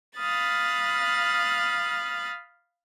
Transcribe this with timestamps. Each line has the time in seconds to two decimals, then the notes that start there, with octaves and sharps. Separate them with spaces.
0.17 F5 B5 D#6 F6 F#6 A6